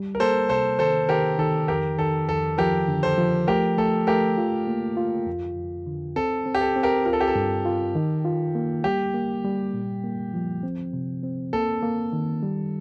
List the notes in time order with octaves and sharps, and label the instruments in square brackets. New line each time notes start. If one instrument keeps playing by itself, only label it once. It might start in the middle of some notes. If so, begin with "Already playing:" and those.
Already playing: [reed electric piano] G3
[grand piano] A#4
[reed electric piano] A#3 [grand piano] A4 C5
[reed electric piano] C3 [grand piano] A4 C5
[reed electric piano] D#3 [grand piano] A4 C5
[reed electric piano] D#3 [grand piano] G4 A#4
[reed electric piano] D#3 [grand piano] A4
[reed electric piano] F2 [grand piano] G4 A#4
[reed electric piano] D#3 [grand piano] A4
[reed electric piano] F2 [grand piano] A4
[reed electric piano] F3 [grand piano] G4 A#4
[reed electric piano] D3
[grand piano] A4 C5
[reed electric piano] F3
[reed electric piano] A3 [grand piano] G4 A#4
[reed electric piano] A3 [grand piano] A4
[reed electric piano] A3 [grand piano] G4 A#4
[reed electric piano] F4
A#3
F4
F2
F2
D3
[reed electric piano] C4 [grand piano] A4
[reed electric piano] C4
[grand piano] G4
A4
[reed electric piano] C4
[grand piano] G4 A#4
[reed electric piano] F4 [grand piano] A#4
[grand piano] A4
G4
A4
[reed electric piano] G2
F4
D#3
F4
A#3
[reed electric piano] G3 [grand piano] G4
[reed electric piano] A#3
G3
A#2
A#3
F3
C4
C3
C4
[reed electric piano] A#3 [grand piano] A4
[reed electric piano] A#3
D#3
G3